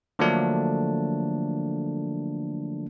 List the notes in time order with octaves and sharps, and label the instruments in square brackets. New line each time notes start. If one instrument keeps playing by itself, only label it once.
[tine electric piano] D3 F3 F#3 A3 A#3 D4